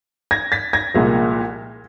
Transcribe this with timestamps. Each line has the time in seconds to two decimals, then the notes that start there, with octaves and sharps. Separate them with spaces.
0.31 G#6 A#6
0.52 A6 B6
0.73 G#6 A#6
0.94 C2 A#2 F3 G#3